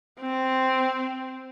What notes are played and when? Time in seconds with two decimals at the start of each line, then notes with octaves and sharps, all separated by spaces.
0.20 C4